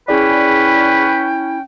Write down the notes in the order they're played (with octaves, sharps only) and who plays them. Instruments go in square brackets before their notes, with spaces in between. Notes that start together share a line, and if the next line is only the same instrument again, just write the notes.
[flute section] C#4 G5 [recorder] E4 [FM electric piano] G#4 D5 [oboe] B4